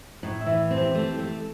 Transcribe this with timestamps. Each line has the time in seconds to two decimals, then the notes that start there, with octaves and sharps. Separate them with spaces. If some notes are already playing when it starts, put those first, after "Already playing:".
0.23 A2 D#4
0.41 E4
0.46 E3
0.71 C4
0.77 G4
0.95 A3
1.19 A3